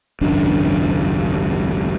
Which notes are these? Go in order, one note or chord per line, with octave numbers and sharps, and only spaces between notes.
G#1 C#2 F#2 D4